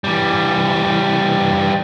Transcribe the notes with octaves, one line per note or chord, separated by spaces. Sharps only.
E3 G3